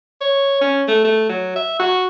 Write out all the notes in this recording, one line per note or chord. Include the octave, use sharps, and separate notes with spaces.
C#5
C#4
A3
A3
F#3
E5
F#4